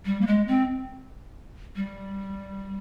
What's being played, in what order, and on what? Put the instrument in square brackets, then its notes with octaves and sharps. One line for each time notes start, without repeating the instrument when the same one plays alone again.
[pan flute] G3
A#3
G#3
C4
G3